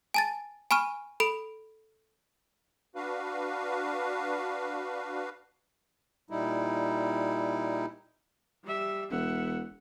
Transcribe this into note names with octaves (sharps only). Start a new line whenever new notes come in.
G#5 A5 A6
G#5 B5 C#6 F6 D#7
A4 B5 D7 F7
D4 F#4 B4 F5
A#2 G3 D#4 E4
G3 E5
E1 E5 F#5